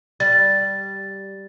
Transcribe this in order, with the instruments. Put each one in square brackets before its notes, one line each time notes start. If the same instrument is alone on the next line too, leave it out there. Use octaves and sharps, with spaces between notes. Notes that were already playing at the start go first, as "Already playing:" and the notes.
[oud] G3 [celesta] A6